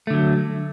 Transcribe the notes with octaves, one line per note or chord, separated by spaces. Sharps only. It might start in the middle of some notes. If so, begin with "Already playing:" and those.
D3 F#3 A3